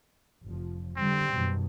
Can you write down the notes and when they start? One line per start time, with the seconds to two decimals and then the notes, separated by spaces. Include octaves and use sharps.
0.45 F1 F3
0.97 D3 G3 C4
1.32 F#2 B2 D#3